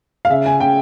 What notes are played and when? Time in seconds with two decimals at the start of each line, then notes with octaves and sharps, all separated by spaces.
0.25 F5
0.29 C#3 E5
0.46 G#5
0.60 C#3 G5